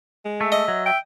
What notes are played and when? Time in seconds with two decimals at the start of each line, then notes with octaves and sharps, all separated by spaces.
0.25 G#3
0.41 A3 E5
0.52 D#5 E5
0.68 F#3
0.86 E5 G5